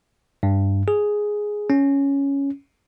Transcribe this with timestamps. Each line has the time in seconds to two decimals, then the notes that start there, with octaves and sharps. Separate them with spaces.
0.43 G2
0.88 G#4
1.70 C#4